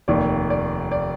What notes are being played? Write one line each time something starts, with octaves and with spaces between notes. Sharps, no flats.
F1 D#2 D#3 D5
D5
D5